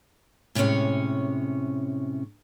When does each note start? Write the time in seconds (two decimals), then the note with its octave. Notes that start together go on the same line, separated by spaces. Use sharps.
0.55 A2 C3 G#3 A3 C#4 C#5